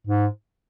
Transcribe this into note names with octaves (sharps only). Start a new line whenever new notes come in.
G#2